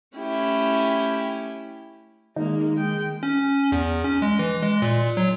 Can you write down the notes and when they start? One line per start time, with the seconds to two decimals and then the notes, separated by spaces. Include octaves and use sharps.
0.16 A3 C#4 E4 G4
2.36 D#3 G#3 A#3 D#4
2.76 G#3 G5
3.23 C#4
3.72 E2
4.04 C#4
4.22 G#3
4.39 E3
4.63 G#3
4.82 A#2
5.17 F#3